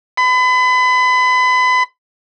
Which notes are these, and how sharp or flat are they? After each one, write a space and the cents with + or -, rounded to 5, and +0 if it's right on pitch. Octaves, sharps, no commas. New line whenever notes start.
B5 +35